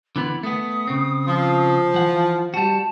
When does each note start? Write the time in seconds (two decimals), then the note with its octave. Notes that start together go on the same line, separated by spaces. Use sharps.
0.16 D3 E3 B3 B5
0.43 A3 B3 D#6
0.88 C#3 C4
1.28 F3
1.94 E3 F#5
2.54 G3 F#4 A5